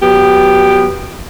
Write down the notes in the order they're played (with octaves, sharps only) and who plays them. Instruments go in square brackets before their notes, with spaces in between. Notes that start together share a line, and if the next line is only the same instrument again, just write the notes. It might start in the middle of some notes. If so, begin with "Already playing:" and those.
[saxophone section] F#3 B3 G4